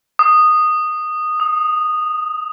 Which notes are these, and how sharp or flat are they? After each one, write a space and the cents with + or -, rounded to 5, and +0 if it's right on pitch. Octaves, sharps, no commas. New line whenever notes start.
D#6 -10
D#6 +25